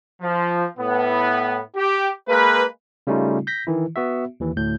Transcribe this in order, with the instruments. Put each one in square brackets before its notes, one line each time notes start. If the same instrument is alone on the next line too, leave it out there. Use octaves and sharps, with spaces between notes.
[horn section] F3
A2 B3
G4
G#3 A#3 B4
[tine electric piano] C#3 G3 A3 C#4 D#4 F4
G6 A#6 B6
D#3 E3 E4
B3 F#4 E5
D#2 E3
D2 A2 G6